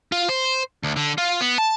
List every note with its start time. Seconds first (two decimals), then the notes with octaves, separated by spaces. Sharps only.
0.12 F4
0.29 C5
0.83 D2
0.96 D3
1.18 F4
1.41 B3
1.58 A5